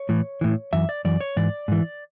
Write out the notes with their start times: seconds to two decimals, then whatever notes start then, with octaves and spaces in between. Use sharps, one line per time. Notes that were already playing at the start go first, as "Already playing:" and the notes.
Already playing: C#5
0.09 A2 E3
0.41 A2 E3
0.73 F#2 E3 E5
0.89 D5
1.05 F#2 E3 D5
1.21 C#5
1.36 G#2 E3 D5
1.68 G#2 E3